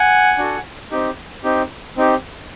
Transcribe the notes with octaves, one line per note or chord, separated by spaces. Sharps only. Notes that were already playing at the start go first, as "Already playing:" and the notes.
Already playing: F#5 G#5
D4 F#4 A4
C4 D#4 G4
C4 D#4 G4
C4 D#4 G4